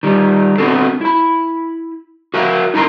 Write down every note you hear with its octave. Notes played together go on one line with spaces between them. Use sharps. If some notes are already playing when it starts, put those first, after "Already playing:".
D#3 G3
B3 C4 D4 F#4 A4
E4 B5
F#4 A#4 E5 F5
D#4 E4 A#4 A#5 C6